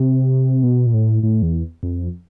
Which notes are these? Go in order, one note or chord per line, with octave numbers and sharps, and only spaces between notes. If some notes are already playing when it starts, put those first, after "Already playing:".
Already playing: C3
B2
A#2
A2
A2
E2
F2